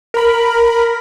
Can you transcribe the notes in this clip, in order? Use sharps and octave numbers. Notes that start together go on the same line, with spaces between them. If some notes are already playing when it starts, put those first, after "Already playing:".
A#4 B5